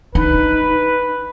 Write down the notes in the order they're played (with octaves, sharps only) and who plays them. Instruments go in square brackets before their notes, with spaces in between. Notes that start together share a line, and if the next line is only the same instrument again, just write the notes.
[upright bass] D4 [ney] D#4 [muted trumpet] B4